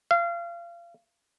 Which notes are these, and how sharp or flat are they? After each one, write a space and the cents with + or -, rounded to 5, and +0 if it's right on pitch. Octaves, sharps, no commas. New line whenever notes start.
F5 -30